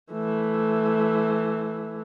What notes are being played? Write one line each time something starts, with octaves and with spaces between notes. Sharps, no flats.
E3 A3